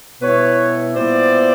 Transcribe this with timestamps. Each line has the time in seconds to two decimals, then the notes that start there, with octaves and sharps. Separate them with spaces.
0.20 B2 G3 B3 E4 B4 C#5
0.95 A#2 G3 B3 E4 C5 D5